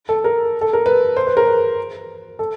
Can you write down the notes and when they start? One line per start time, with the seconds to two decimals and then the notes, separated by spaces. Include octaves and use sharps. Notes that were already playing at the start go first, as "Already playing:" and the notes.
0.09 A4
0.24 A#4
0.61 A4
0.73 A#4
0.86 B4
1.16 C5
1.27 B4
1.37 A#4
1.47 B4
2.39 A4